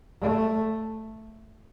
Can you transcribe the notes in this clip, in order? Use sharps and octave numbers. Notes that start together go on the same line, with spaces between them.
A3